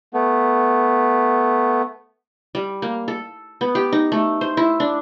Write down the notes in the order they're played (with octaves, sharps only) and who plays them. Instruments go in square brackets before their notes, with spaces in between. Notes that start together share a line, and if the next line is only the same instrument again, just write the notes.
[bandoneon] A3 B3
[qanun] G3
A#3
A4
B3
G4
D#4
A3
C5
E4
D4